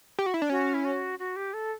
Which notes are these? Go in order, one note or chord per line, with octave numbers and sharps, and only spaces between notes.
G4
F#4
E4
D4
C#4 F#4
E4
F#4
F#4
G4
A4